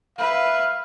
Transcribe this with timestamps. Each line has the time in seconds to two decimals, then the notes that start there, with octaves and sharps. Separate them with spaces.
0.18 B4 E5 F5